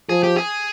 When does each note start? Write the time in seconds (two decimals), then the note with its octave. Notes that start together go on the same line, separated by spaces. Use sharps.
0.09 F3 G#4
0.23 G4
0.37 G#4